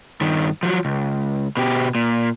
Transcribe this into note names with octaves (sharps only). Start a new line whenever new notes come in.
G2 D#3
F3 F#3
C#2
B2 G4
A#2